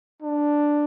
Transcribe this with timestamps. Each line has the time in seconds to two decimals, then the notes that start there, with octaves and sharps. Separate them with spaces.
0.22 D4